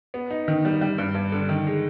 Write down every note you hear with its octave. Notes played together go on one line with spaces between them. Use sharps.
B3
D#4
D#3
G3
G3
G2
G2
D3
D#3
G#3